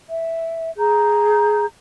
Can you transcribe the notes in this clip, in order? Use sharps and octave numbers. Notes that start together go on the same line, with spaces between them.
E5
G#4 A#5 G6